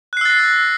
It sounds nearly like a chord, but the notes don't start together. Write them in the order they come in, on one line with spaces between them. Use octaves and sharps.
F#6 C7 E6 A6 A#6